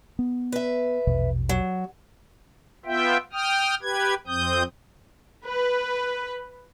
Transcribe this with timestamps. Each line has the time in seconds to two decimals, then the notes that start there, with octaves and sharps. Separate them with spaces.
0.19 B3
0.52 B4 E5
1.07 A#1 E2 B2
1.49 F#3
2.85 B3 F4 E5 G5
3.33 G5 D#6 F6
3.82 G4 B4 G#6
4.27 F2 C4 D#6 G6
5.45 B4